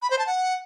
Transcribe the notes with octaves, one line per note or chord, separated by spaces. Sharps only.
B5
C5
A5
F#5